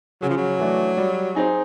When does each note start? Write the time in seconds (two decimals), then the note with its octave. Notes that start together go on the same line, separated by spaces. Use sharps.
0.22 C#3 F#3
0.29 F3
0.37 F#3
0.59 E3 A3 D4
0.97 G3
1.35 C4 D#4 G#4